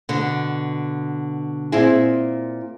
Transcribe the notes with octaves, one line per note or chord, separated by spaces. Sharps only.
B2 D3
A#2 C4 E4 G#4